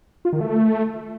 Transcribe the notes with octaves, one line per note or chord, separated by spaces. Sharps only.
F4
D#3
A3